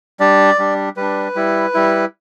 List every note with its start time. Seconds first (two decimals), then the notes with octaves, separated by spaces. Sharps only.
0.20 G3 D4 D5
0.59 G3 D4
0.97 G3 D4 B4
1.35 G3 E4
1.74 G3 E4